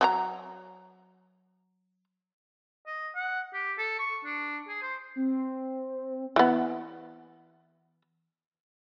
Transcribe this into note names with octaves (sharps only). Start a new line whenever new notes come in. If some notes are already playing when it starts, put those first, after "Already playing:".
F#3 A4 A#5
D#5
F#5
G4
A4
C#6
D4
G#4
C5
C4
E3 B3